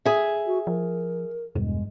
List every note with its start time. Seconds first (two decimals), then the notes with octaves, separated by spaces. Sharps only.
0.05 G#4 E5
0.46 F#4
0.67 F3 A#4
1.55 E1 G2 G#3